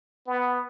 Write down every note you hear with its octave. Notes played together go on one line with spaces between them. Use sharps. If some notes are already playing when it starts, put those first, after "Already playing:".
B3